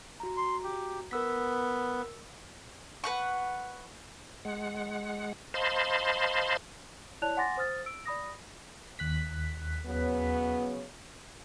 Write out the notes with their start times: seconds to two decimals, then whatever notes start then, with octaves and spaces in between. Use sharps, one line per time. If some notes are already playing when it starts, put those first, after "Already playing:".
0.20 F#4 A#5
0.37 C6
0.64 G4
1.11 B3 A#4 E6 B6
3.04 B4 F#5 C#6
4.45 G#3 F#5
5.54 C5 D#5 F5 A5 B5 C6
7.22 E4 C#5 D5 A5 F#6 F7
7.37 F#5 G#5 C6 D6 A6 A#6
7.57 C5 D#6 F6 A6
7.86 E6 D7
8.06 D5 B5 D#6 A#6
8.99 D#2 F#6 B6
9.86 C#3 F#3 B3